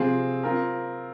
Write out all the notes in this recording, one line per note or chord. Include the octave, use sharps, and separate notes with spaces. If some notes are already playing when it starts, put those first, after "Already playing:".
Already playing: C3 F3 C4 F4 G#4
C4 F4 A#4